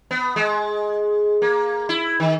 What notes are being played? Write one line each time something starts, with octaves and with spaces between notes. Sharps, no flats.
B3
G#3
A#3
E4
D#3